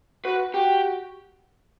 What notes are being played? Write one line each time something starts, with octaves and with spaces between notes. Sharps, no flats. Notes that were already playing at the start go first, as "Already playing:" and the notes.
F#4 B4
F#4 G4